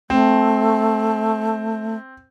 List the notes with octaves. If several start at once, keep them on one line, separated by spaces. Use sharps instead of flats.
A3 C4